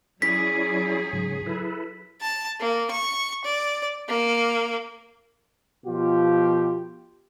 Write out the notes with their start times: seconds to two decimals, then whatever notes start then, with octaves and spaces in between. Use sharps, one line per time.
0.22 F#3 C#4 E4 G#4 D5 B6
1.13 G#2 C#3
1.46 E4 A4 B4
2.21 A5
2.60 A#3
2.91 C#6
3.45 D5
4.09 A#3
5.86 B2 F3 F4 G4